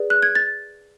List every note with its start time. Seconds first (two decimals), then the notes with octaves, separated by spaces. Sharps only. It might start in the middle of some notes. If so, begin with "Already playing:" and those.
Already playing: G#4 B4 D5
0.10 F#6
0.22 G#6
0.35 A6